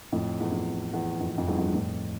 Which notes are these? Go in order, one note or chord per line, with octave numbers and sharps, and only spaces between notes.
F2 A2
E2
F2
E2
F2
E2
F2
E2 G2
F2
G2
F2 A2